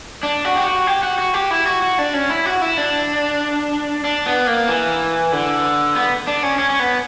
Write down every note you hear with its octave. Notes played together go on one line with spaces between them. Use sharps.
D4
F#4
G4
F#4
G4
F#4
F#4
G4
E4
F#4
F#4
D4
C#4
E4
F#4
E4
D4
D4
B3
A#3
E3
D3
B3
D4
C#4
C#4
C#4
B3